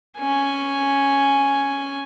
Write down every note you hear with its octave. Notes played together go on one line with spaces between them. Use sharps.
C#4 G#5